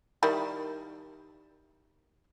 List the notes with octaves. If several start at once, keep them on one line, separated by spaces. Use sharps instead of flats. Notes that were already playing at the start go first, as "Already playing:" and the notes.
D#3 G3 E4